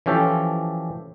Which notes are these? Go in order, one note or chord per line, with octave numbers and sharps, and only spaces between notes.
E3 F3 C#4 G4 A4